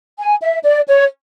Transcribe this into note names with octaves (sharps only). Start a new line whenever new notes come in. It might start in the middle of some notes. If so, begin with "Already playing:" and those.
G#5
E5
D5
C#5